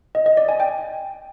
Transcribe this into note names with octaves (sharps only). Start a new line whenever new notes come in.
D#5
D#5
D5
G#5
G5